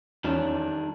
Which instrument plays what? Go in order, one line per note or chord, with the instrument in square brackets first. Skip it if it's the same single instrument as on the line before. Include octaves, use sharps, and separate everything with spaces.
[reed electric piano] E2 C#4 [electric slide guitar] D#3 G3 D4